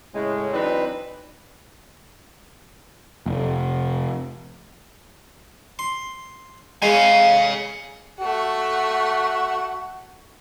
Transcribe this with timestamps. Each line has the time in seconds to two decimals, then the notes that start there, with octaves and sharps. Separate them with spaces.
0.14 A2 C#3 G#3
0.53 E3 F#3 C4 D4 D#4 B4
3.26 F1
5.79 C6
6.82 G#3 F5 G#5
8.21 A3 F#4 F#5